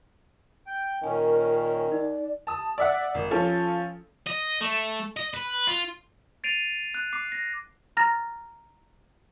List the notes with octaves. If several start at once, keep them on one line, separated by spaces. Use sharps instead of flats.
G5
A#2 D#3 C#4 A#4 G#5
D#4 D5
A5 D#6
D5 E5 F#5
G#1
F3 C#4 F4 A4
D#5
A3
D#5
B4
F4
A6 C7 D7 D#7 F7
F#6
D6 C7
A#6
A#5 F6 A6 A#6